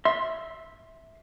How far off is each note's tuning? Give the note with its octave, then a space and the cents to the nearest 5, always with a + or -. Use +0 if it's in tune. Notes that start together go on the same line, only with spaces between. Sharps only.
E5 -10 C6 +15